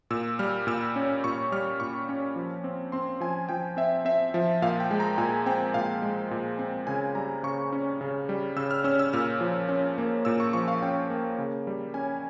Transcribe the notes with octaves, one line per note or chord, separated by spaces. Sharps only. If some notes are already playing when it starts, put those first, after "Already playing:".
A#2 E6
G3 F6
A#2 E6
C#4
A#2 C#6
G3 F6
A#2 C#6
C#4
F3
C4
C4 C6
F3 G#5
F3 G5
C4 E5
C4 E5
F3
A#2 F5
G5
G#3
A#5
A#2 G#5
C4 G5
A#2 F5
G#3
A#2
C4
C#3 G#5
G3 A#5
C#3 C#6
C#4
C#3
G3
C#3 E6
F6
C#4 E6
E6
A#2 F6
F3
C#4
A#3
A#2 E6
C#6
F3 C#6
F5
C#4 G5
A#3
C#3
G3
C#4 G#5